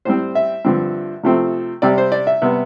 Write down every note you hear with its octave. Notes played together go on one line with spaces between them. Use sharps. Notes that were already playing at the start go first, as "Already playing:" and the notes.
A2 G3 C4 C5
E5
G2 D3 F3 C4
C3 F3 A3 C4
C3 G3 C4 D5
C5
D5
E5
C3 G3 B3